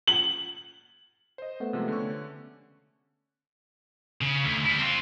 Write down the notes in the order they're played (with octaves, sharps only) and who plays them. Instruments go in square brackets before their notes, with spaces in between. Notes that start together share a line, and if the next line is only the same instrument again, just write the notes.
[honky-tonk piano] F#7
[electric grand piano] C5 D#5
[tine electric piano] A3 B3
[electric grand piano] C3 F3 G#3
D3 C#4 C#6
[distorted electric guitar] C#3
D2
G3 E4
C4 F4